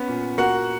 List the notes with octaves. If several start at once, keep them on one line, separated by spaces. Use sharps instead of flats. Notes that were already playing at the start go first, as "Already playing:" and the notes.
Already playing: B3 C#4
A#2
A#3 F#4 F#5